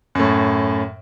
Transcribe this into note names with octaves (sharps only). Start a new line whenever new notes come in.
F#2 A2